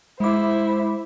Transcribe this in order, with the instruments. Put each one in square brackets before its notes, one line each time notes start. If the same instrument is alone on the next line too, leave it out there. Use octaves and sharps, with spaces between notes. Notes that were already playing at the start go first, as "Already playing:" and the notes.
[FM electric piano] G#3 D6 [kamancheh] E4 C5